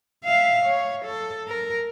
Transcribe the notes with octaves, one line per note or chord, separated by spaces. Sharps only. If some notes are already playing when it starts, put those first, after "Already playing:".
E5 F5
C#5
A4
A#4